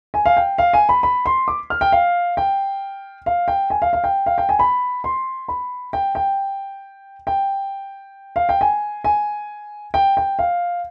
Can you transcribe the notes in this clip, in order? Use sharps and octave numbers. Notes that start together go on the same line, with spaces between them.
G#5
F5
G5
F5
G#5
B5
B5
C6
D6
F6
G5
F5
G5
F5
G5
G#5
F5
F5
G5
F5
G5
G#5
B5
C6
B5
G5
G5
G5
F5
G5
G#5
G#5
G5
G5
F5